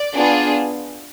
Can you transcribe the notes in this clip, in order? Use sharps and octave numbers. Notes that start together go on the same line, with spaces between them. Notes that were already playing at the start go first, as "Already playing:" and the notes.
Already playing: D5
B3 D4 F4 G#4